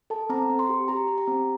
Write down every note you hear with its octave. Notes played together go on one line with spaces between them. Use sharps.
A4 A5
C4 A#5
C4
C6
G4
G4 A#5
G4
A#5
C4